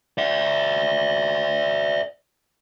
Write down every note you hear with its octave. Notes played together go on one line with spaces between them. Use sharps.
D5 E5